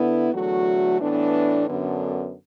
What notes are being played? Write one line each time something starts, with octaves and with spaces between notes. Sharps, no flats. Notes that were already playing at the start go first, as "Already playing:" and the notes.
Already playing: D3 B3 E4
E2 D3 F#3 A3 F#4
A2 E3 B3 D4
F#2 D3 B3